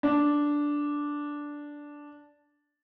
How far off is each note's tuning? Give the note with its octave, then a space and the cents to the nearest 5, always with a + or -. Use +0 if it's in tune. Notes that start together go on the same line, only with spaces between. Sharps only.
D4 -5